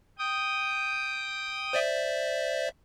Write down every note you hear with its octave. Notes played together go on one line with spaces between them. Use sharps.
G5 D#6
C5 D5 E5